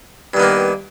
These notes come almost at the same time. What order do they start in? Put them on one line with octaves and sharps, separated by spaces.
G2 D#3 B3 A#3